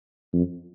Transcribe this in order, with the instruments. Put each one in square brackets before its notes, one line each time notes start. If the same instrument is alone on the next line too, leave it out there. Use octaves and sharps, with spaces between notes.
[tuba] F2